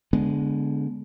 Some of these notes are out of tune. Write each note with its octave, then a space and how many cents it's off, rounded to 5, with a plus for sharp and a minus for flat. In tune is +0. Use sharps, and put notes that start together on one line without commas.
D3 -20 G#3 +0 B3 +0